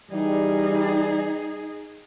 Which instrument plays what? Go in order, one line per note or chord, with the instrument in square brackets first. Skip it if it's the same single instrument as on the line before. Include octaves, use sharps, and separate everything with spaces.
[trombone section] E3 G3 [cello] D#4 G#4